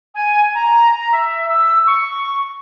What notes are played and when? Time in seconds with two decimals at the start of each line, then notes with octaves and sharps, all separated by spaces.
0.15 G#5
0.54 A#5
1.12 E5
1.49 E6
1.87 C#6